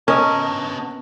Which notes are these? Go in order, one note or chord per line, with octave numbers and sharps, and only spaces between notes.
B3 C#4 A#4 D#5 A5 D#6